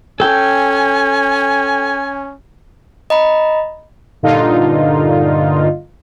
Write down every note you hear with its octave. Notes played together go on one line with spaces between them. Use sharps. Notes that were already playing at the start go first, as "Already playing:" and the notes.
C#4 A4 G5 G#5
D#5 A#5 B5
G2 A#2 D3 D#4 F4